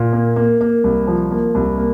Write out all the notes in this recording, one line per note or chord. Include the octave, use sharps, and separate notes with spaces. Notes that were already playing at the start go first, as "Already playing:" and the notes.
Already playing: A#2
A#3
A#3
A#3
C2
F3
A#3
C2
A#3